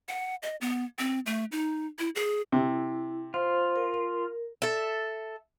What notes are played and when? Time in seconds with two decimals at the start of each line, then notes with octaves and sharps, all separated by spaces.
0.09 F#5
0.43 D#5
0.61 B3
0.99 C4
1.26 A3
1.52 D#4
1.99 E4
2.15 G#4
2.52 C3 E4
3.34 F4 C5
3.76 A#4
4.62 A4 E5